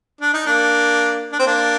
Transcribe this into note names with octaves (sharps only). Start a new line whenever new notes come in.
D4
D#4
A#3 D4
D4
C4
A#3 D4